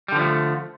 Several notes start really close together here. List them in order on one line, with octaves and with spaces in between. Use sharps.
G3 D3 F3 A3